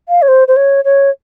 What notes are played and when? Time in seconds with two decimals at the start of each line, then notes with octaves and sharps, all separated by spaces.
0.09 F5
0.22 C#5
0.28 C5
0.48 C5
0.56 C#5
0.85 C#5